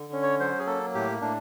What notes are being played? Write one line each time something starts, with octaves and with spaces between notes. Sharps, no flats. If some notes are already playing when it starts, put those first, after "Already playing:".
Already playing: D3
C#4
C#5
F#3 C5
G#4
A#3 A4
A2 G4
A2 D4